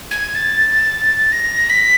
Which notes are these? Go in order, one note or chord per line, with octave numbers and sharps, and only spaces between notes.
G#6
A6
A#6
B6